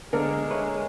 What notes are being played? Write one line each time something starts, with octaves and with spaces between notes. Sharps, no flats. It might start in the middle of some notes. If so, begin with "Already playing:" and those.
D3 G#3 A#3 B3 A4 A#4
B4 C#5 E5 C#6